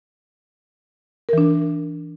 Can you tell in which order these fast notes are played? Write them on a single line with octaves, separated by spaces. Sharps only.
A#4 E3 D4